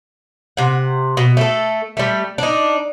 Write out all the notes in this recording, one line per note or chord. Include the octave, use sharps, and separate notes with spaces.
C3 F#5
B2
A3 A4
G3 A3
D4 D#4